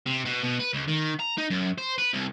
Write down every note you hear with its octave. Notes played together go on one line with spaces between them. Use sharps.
C3
B2
B2
B4
C#2
D#3
A#5
D#4
F#2
C5
B4
C2